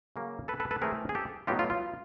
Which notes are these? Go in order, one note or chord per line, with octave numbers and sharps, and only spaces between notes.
C#3 F#3 A#3 C#4
A4 B4
A4 B4
A4 B4
E3 A3 C4 G#4 A#4
G#4
G4 A4
A2 F#3 B3 D#4 F4 G4
F4
F4